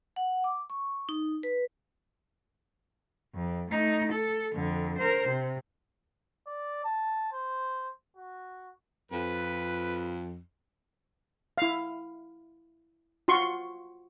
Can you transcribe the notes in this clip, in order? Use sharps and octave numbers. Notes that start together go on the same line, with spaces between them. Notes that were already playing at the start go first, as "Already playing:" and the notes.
F#5
D6
C#6
D#4
B4
F2
A3 D#4
A4
F2 D3
A#4 C5
C3
D5
A5
C5
F#4
F2 B4
E4 F5
F4 F#4 C6 C#6